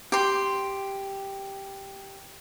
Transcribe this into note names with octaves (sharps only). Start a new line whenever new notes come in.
G4 C6